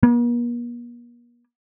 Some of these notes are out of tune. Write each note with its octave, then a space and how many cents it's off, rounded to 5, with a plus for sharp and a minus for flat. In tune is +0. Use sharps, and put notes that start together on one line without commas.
A#3 +45